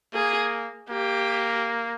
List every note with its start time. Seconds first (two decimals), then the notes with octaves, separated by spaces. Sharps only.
0.14 A#3 G#4
0.90 A#3 G4